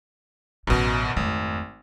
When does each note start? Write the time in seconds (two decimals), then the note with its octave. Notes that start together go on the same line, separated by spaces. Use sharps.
0.67 A1 F#2 B2 D3
1.17 G#1 F2 A3